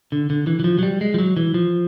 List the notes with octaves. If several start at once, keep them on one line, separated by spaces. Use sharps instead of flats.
D3
D3
E3
E3
F3
F#3
G3
G#3
F3
F#3
E3
F3